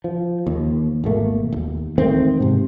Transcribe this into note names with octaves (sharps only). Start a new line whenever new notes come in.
F3
D#2
G#1 B2 A3 A#3
D#1 D#2
E1 D#3 A3 C4
G#2 C3